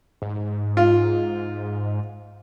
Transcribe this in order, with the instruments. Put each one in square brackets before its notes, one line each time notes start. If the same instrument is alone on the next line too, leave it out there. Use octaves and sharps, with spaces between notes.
[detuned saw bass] G#2
[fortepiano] F4